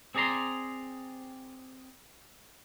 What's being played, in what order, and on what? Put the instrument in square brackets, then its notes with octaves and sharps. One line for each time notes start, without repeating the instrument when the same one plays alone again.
[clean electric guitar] C4 G#4 D5 A#5 C6